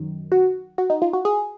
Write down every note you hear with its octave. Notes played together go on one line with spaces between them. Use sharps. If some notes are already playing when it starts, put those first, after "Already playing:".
Already playing: F#2 D#3
F#4
F#4
D#4
F4
F#4
G#4